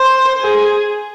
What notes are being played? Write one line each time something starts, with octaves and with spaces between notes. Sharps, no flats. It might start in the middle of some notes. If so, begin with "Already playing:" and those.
Already playing: C5
G#4